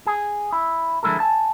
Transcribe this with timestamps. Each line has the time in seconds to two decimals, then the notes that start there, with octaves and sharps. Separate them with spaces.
0.06 G#4
0.53 E4
1.03 D3 F3 G#3 E4 A4 A#4
1.20 G#5 A5